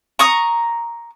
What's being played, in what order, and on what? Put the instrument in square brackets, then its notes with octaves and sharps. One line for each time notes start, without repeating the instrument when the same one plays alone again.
[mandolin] A#5 C#6 D#6